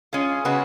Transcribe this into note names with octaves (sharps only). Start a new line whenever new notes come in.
G#3 C#4 F4 G#4
C#3 G#3 B3 F#4